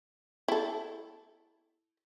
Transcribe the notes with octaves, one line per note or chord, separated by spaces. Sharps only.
E4 A4